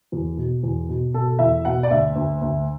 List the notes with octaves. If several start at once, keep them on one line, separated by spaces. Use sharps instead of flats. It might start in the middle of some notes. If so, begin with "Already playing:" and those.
E2
B2
E2
B2
B2 A4
E2 E5
B2 F#5
D5
D2 E5
D2
D2